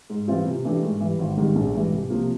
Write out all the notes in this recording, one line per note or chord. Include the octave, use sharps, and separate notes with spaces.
G#2
E3 G3 C4 F4
C3
E3 A3 D4 G4
G#2
E3 G3
G#1
G#2 D#3 G3
A#1
G#2 E3 G3
C2
C3 F3 A#3